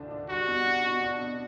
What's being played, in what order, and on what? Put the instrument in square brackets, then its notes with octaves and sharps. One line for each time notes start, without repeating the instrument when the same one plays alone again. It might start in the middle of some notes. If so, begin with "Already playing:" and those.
Already playing: [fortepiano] D2 D3 D4
D4
[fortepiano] G3 [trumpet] F#4
[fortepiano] B2
D4
B2
D4
B2